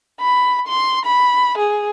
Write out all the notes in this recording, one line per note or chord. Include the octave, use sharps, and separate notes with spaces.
B5
C6
B5
G#4